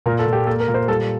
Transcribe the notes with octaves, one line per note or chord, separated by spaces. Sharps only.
A#2 A#4
A4
A#2
G4
A#3 A4
A#4
A#2
C5
G3 A4